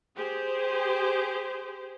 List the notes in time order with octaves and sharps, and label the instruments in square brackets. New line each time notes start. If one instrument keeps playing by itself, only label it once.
[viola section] G4 G#4 C5